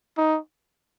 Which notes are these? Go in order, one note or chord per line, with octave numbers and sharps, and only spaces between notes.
D#4